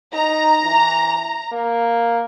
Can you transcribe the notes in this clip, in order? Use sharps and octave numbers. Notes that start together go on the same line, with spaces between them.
D#4 A#5
E3
A#3